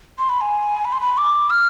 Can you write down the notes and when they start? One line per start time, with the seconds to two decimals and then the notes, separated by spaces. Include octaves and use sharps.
0.19 C6
0.29 B5
0.41 G#5
0.85 B5
0.92 C6
1.01 B5
1.17 D6
1.50 F6